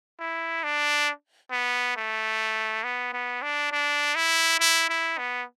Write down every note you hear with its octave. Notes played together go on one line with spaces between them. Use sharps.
E4
D4
B3
A3
B3
B3
D4
D4
E4
E4
E4
B3